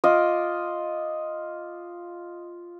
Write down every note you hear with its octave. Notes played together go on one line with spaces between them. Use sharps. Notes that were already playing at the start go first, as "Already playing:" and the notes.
F4 D#5 D6